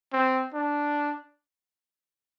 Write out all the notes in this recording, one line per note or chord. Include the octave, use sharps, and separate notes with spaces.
C4
D4